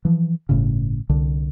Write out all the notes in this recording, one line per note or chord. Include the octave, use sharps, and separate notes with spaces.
E3 F3
G1 A2 C#3
C2 D3